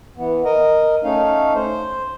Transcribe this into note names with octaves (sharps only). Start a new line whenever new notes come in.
E3 B3
A#4 D#5
A3 C#4 D#4 F5
C5